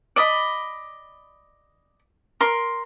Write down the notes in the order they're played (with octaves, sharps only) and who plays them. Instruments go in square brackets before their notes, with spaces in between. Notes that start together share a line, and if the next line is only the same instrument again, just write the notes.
[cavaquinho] D5 D#5 B5
A#4 C6